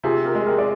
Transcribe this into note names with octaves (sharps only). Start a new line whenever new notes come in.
C3 F4 G#4
G4 A#4
G#3
G4 A#4
D5